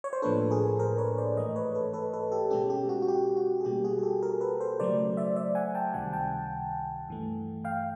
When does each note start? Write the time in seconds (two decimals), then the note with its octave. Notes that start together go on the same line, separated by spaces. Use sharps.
0.04 C#5
0.13 C5
0.22 A2 F3 A#3 D4 A4 B4
0.51 G#4 A#4
0.79 A#4 C5
0.98 B4 C#5
1.18 C5 D5
1.37 G#2 E3 A3 C#5 D#5
1.56 B4 C#5
1.75 A4 B4
1.93 A4 B4
2.13 A4 B4
2.32 G4 A4
2.50 B2 G#3 C#4 G4
2.70 G4
2.89 F#4
3.02 F#4
3.08 G4
3.37 F#4
3.61 G#4
3.65 B2 G3 A#3 G4
3.84 F#4 G#4
3.99 G#4
4.03 G4 A4
4.23 G#4 A#4
4.41 A4 B4
4.61 A#4 C5
4.80 C#3 F#3 A3 C5 D5
5.17 D5 E5
5.36 D5 E5
5.55 F#5 G#5
5.75 G5 A5
5.94 C#2 C3 D#3 G3 F#5 G#5
6.13 G5 A5
7.09 G2 E3 A3
7.64 F5 G5